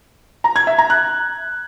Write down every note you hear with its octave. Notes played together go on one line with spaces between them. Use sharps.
A#5
G#6
E5
A#5
F#6